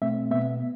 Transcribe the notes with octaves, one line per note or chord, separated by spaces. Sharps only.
B2 A3 C4 E5
B2 B3 E5